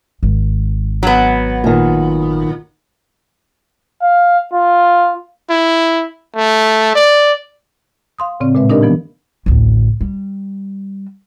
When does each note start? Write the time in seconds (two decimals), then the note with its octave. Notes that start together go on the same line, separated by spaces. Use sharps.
0.23 G#1
1.03 F#3 B3
1.64 A#2 D#3
4.02 F5
4.53 F4
5.50 E4
6.36 A3
6.95 D5
8.19 F5 C6 D#6
8.40 A2 C#3 C4 D5
8.55 A#2 G#3 B4 E5
8.70 D4 D#4 G4 A#4 D5 D#5
8.83 E3 F3 B3
9.46 A1 D2
10.01 G3